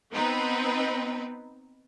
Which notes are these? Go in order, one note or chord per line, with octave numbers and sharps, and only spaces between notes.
B3 C4 D#4 B4